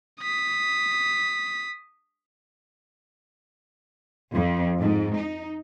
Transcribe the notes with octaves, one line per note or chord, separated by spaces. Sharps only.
D#6 B6
F2
G#2
D#4